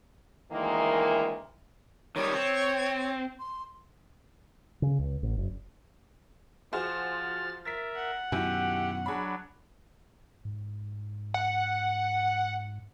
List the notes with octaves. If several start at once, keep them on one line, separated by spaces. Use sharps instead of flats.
D2 D#3 E3 G#3 A#3
D#3 G3 C#5
C4
C6
C#3
C#2
A1
F#1
F3 F#4 G#4 C5 F6 A6
A#4 E5 A6 B6
F#5
F#2 B2 D#3 E4 F#4 G4 G5 G#5
F#3 D4 G#4 B5
G#2
F#5